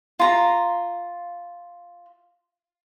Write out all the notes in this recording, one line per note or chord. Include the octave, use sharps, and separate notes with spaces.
F4 A#5